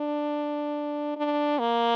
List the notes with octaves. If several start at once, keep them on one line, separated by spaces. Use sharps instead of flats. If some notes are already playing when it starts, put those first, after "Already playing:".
Already playing: D4
D4
A#3